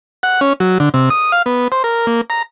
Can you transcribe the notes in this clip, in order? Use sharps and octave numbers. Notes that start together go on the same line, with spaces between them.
F#5
C#4
F#3
D3
C3
D#6
F5
B3
C5
A#4
A#3
A#5